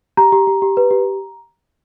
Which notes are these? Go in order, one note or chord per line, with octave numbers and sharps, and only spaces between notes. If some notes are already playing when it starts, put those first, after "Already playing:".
G4 A#5
G4
G4
G4
B4
G4